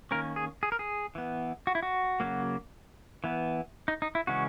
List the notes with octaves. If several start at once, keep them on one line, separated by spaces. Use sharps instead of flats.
D#3 A#3 C#4 A#4
G#4
G#4
A#4
G#4
E3 B3
F#4
E4
F#4
C#3 F#3 A#3
E3 B3
D#4
D#4
E4
C#3 E3 G#3 C#4 F#4